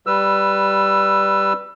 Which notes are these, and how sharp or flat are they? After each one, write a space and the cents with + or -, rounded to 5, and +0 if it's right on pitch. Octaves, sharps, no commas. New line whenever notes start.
G3 +0 B4 -5 E6 +20